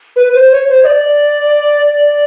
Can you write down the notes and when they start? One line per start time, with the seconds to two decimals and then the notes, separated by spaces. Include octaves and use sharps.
0.16 B4
0.34 C5
0.52 C#5
0.69 C5
0.83 D#5
0.86 D5